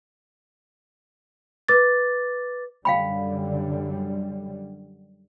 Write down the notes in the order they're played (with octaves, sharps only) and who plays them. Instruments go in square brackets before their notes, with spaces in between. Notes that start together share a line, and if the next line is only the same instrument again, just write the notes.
[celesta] B4 D6 A6
[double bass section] F#2 D3 G3 [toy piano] F5 G5 B5